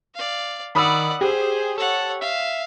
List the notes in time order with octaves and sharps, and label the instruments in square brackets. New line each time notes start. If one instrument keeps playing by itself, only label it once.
[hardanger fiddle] D5 F5
[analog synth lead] D#3 [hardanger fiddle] D5 F#5 [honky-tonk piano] B5 D#6 E6
[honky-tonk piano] G4 [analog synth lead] G#4 [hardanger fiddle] C5
[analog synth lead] A4 [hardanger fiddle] C#5 F#5
[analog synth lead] E5 [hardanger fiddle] F5